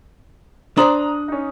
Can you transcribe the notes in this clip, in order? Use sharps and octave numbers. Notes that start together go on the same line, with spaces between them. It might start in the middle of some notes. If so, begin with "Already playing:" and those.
D4 C5 D5 A#5 D#6 F#7
C#4 D#4